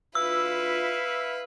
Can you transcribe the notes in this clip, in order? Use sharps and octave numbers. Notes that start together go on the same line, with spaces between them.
D2 D4 E4 F4 B4 E5 F5 E6